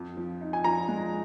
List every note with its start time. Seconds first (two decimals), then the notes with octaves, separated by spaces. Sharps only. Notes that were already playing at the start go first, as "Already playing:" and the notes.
Already playing: F2
0.17 F3
0.41 D#4
0.53 G#5
0.64 F3 A#5
0.88 G#3